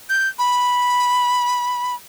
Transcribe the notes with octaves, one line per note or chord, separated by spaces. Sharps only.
G6
B5